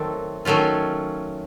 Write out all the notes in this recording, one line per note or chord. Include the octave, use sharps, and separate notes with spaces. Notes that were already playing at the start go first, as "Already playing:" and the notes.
Already playing: D#3 F#3 A3 C4
D#3 F#3 A3 C#4 F4